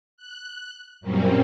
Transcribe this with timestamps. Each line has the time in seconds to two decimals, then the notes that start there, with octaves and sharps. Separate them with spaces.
0.17 F#6
1.01 F#2 A#2 G3 A#3 C4 C#4